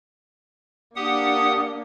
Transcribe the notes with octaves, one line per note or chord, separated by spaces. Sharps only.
A#3 D4 G4 F#5 D#6